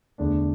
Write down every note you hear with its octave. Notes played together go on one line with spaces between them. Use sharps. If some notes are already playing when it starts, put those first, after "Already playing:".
E2 D3 A3 D4